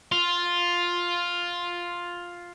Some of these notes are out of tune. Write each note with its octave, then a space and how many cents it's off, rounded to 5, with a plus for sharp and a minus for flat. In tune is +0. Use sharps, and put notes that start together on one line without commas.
F4 +5